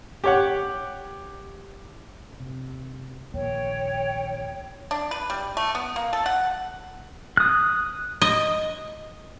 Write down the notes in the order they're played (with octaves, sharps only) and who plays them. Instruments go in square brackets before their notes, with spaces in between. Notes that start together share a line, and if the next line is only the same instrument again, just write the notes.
[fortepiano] G4 C#5 F#5
[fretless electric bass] C3
[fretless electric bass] A#1 D#2 A#3 [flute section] C#5 G5
[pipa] D4
B4
G3
A3
B3
A#3
A4
F#5
[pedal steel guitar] D#6 F#6
[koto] D#5